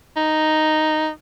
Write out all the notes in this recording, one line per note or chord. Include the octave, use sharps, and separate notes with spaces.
D#4